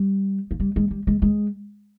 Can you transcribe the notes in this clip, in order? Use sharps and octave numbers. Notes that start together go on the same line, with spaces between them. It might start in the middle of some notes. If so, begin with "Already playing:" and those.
Already playing: G3
F3
G3
G#3
G3
G#3
G#3